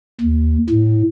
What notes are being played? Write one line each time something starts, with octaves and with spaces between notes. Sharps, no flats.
D#2
A2